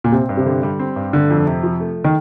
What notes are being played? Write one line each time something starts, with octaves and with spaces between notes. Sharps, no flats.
A#2
C3 C4
G2
C3
D3
G3
C4
G2
D3 A3
F2
C3
F3
A3
D#3